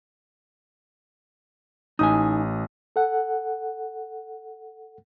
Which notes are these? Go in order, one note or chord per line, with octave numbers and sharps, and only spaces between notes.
A1 D#4 G#5 D#6
A4 F#5